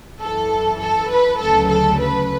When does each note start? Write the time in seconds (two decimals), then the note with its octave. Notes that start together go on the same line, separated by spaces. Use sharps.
0.21 F#2 E3 A4
0.80 A4
1.10 B4
1.40 D2 C#3 F#3 A4
1.69 A4
1.99 B4